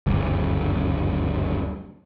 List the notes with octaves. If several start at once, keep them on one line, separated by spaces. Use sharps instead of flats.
F#1 D2 G2